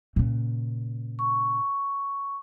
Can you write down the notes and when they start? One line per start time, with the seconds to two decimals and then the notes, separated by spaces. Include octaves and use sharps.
0.16 A#2 C#3
1.19 C#6